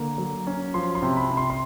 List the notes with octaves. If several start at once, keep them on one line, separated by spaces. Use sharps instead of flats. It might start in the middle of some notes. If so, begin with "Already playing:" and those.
Already playing: D3 A#3
F#3
C#4
F3 C6
C6
C3
B5
C3
C6
C6